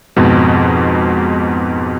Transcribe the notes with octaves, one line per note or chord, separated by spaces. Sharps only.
F2 G#2 B2